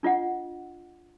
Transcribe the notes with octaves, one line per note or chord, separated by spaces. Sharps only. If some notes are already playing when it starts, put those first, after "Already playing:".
D4 F4 D#5 F#5